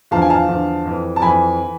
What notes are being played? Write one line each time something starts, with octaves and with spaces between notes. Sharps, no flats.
E2 D3 F3 F5 A5
G#5
F5 A5
E2 D3 F3
F2 E3
A5
F2 E3 G#5 B5
E3